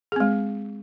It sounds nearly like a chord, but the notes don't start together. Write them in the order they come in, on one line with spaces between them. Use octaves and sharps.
G#4 C4 G#3